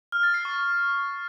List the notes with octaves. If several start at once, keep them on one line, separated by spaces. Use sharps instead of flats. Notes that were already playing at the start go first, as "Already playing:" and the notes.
F6
A6
C7
C#6